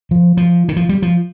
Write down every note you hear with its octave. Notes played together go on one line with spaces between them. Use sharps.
F3
F3
D#3
F3
G3
F3